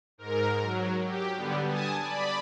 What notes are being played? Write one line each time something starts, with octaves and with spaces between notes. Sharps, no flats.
G#2 A#4
F#3
G4
D3 G3 B3
G#5 A5 D#6
D5 B5